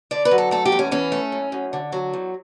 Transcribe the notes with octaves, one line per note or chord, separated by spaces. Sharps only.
D3 D5
B4
F#3
A4
A3 A4
G4
E2
C#4
E3 C#4
A3
F#2
F#2
D3
F#3
E2